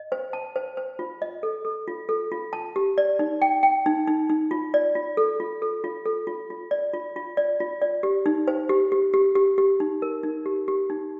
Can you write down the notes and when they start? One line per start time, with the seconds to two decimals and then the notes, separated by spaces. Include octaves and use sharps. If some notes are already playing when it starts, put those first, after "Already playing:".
Already playing: D#5
0.12 C5
0.33 A5
0.56 C5
0.77 C5
0.99 F4
1.22 D#5
1.43 A4
1.65 A4
1.88 F4
2.09 A4
2.32 F4
2.53 A5
2.76 G4
2.98 D5
3.19 D#4
3.42 G5
3.63 G5
3.86 D#4
4.07 D#4
4.29 D#4
4.51 F4
4.74 D5
4.95 F4
5.17 A4
5.40 F4
5.62 A4
5.84 F4
6.05 A4
6.27 F4
6.50 F4
6.71 D5
6.94 F4
7.16 F4
7.37 D5
7.60 F4
7.82 D5
8.03 G4
8.26 D#4
8.48 C5
8.69 G4
8.92 G4
9.14 G4
9.35 G4
9.58 G4
9.80 D#4
10.02 A#4
10.23 D#4
10.46 G4
10.68 G4
10.90 D#4